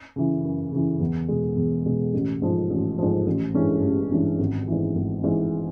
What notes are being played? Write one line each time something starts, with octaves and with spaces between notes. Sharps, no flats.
C#3 E3
F#2
C#3 E3
E2
B2 G#3
E2
B2 G#3
A1
G#2 F3
A1
G#2 F3
A1
G2 E3 G#3 C#4
A1
G2 E3 G#3 C#4
G#1
G#2 E3
G#1
G#2 E3